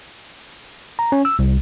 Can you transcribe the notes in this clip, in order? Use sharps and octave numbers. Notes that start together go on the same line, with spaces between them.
A#5
C#4
E6
C2